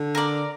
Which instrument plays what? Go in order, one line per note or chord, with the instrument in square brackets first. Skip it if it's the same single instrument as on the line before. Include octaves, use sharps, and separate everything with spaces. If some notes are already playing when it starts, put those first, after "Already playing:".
Already playing: [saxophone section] D3
[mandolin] A#4 D5